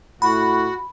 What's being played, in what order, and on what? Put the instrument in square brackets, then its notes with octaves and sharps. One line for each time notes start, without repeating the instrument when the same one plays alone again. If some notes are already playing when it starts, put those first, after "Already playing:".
[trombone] A2 [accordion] F#4 [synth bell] B5